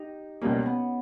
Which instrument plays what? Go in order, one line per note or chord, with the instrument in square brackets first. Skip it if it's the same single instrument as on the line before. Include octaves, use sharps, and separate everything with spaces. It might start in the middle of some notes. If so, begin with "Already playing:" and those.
Already playing: [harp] D#4 G4
[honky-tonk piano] C#2 B2 G3 A#3 [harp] C#4
[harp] B3